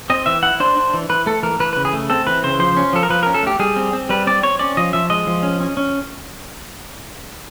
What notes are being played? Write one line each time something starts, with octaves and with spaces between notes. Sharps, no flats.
C4 D#5
E3 E5
E4 F#5
D4 C5
D4
E3
E3 B4
A3 A4
E3 A#4
E3 B4
C#3 B4
G#4
A3
C4 A4
E3 B4
C#3 C5
F3 C5
C#4
F3 A4
A#4
F3 B4
A#4
C#4
A4
A3 G4
G3 G#4
C4
C4
G3 B4
C4 D5
C4 C#5
C#4 D5
F3 D#5
F3 E5
G#3 D#5
F3
C#4
C#4
C#4